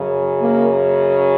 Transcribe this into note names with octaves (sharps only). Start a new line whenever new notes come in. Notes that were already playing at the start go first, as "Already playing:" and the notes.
Already playing: F#2 C#3
A#3